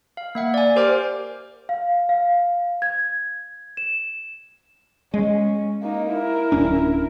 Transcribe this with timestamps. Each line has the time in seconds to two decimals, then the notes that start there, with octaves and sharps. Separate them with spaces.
0.17 F5
0.35 A#3 E5 F#5
0.54 D5 G#5
0.76 G4 A#4 C5 D5 D6 F6
1.69 F5
2.09 F5
2.82 G#6
3.77 E7
5.14 G#3 C#4
5.83 A#3 D#4
6.12 E4 A#4
6.52 D1 C#4 D4